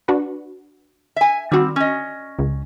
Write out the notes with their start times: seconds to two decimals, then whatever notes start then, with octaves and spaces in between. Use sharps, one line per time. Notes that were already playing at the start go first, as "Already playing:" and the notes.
0.08 D4 F#4 B4
1.16 E5 G#5
1.52 D#3 G3 C4 F#4
1.76 C#4 D#5
2.39 C#2